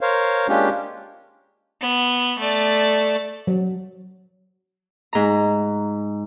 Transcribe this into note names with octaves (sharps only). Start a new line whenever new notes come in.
A#4 C5 C#5 F5
G#3 A#3 C#4 D4 F4 G4
B3
A3 D5
F#3
G#2 A#5